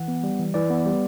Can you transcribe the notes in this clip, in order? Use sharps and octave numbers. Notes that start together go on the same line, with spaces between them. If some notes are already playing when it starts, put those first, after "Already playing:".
Already playing: E3 F#5
B3
G3
E3
E3 D5
B3
G3